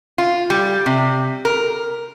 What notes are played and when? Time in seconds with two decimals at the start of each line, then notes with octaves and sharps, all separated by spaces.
0.18 F4
0.50 G3
0.86 C3
1.45 A#4